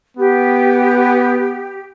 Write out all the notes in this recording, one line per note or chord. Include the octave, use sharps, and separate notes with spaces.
B3 G4